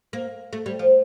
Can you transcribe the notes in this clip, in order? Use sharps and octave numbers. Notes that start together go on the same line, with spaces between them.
A#3
A3
G3
F3